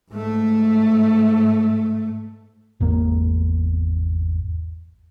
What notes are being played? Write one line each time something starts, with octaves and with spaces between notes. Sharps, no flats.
G#2 A3
G#1 E2 A#3